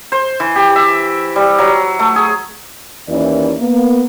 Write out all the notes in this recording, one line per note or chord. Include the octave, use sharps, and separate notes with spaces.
C5
E3
G4
E5
G3
F#3
A3
G#4
D#2 E3 C#4 E4 A#4 D5
A#3 B3